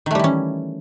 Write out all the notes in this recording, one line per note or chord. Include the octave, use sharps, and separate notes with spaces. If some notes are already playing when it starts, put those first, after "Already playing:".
D#3 E3 G3 A3 C#4